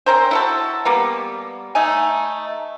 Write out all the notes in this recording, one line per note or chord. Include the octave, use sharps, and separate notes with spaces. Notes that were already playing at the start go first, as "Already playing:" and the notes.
C4 C#4 A#4 C5
E4 F#4 A4
G3 A#3 B3
A3 D#4 G#5